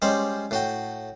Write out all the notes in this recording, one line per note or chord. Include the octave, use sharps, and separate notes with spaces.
G3 G#3 C#4 C5 D5
A2 F#4 G5